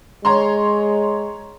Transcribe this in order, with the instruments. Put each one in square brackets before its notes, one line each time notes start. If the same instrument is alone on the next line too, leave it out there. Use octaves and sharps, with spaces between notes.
[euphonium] G#3 [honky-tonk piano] C#5 A#5 C6